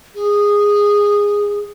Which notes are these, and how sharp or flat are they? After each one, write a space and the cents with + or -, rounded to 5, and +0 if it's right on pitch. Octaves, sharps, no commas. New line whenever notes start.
G#4 -15